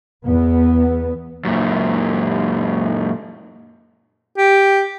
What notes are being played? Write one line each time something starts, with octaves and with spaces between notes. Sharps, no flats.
E2 B3
F#2 A#2
G4